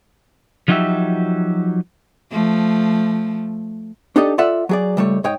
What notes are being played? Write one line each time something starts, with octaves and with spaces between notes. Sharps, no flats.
F3 F#3 D#4 F#4 G4 E5
F3 A3
D4 D#4 G4 A4 D5 D#5
F4 A4 D5 E5 F#5
F#3 G#4 D5
C#2 G3 A3 C#5
G#2 C#5 D#5 G5